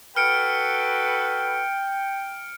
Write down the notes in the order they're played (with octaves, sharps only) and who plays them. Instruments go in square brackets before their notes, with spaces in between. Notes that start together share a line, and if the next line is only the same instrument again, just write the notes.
[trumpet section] F#4 A4 B4 [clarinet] G5 [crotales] F6 C#7 D7